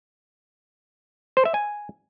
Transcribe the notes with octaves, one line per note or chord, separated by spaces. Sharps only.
C5
E5
G#5